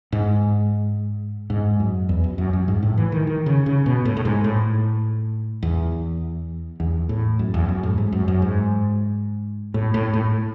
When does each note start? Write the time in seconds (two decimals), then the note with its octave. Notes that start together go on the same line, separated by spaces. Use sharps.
0.12 G#2
1.50 G#2
1.80 F#2
2.09 E2
2.24 F#2
2.38 F#2
2.53 F#2
2.68 G#2
2.83 A2
2.98 E3
3.12 D#3
3.27 D#3
3.46 C#3
3.66 C#3
3.86 B2
4.05 A2
4.17 A2
4.25 G#2
4.44 A2
5.63 E2
6.80 E2
7.09 A2
7.39 F#2
7.54 E2
7.69 F#2
7.83 A2
7.98 G#2
8.12 F#2
8.28 F#2
8.42 G#2
9.74 A2
9.94 A2
10.13 A2